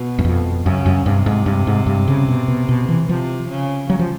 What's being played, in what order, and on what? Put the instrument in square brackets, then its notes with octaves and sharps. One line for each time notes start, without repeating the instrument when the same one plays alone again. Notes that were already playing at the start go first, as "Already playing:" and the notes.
Already playing: [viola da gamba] B2
[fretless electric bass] F#2
F2
[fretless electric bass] F#2 [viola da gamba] C#3
[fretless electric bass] F#2
[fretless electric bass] G2 [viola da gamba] C3
[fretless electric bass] G#2
G2
G#2
G2
C#3
B2
B2
B2
E3
[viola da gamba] C3 [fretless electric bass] F3
[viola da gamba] C#3
[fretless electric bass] F#3
F3